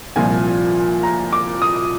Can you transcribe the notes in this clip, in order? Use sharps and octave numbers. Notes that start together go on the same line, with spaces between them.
C2 A#2 F3 G#5
A#5
D6
D#6